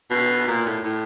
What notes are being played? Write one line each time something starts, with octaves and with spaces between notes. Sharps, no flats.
B2
A#2
A2
A2